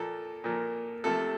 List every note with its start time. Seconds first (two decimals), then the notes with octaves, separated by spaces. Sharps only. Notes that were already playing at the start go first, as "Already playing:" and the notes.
Already playing: A#2 F3 A#3 A4
0.44 A#2 F3 A#3
1.04 C3 F3 A3 A4